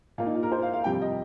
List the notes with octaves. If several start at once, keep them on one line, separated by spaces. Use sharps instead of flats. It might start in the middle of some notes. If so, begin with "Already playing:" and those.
A#2 A#3 F4
D#4
F4
A#4
C5
F5
F5
F2 C3 G3 G5
D#5